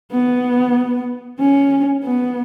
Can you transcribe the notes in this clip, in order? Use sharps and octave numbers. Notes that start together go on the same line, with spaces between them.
B3
C#4
B3